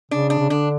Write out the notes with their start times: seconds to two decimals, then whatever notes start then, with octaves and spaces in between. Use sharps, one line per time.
0.11 C#3 D4
0.30 D4
0.39 C#3
0.50 D3 D4